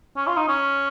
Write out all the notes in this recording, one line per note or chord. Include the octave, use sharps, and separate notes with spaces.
C#4
F4
D#4
C#4